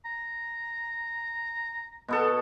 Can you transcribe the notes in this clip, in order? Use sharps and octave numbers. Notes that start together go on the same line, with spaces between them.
A#5
B2 B3 A4